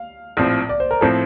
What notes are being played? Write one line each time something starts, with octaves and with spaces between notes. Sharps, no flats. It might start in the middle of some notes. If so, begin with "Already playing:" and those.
Already playing: F5
A#1 A2 F3 C4
D5
C5
A#4
A2 F3 C4 A4